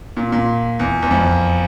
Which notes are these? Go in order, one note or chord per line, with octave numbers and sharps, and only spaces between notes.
A#2
A#2
E2
E2
F2